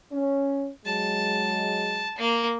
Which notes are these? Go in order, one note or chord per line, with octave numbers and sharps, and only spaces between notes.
C#4
F#3 G#3 A5
A#3